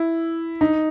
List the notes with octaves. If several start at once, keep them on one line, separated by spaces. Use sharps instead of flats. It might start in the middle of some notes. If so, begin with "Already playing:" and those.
Already playing: E4
D#4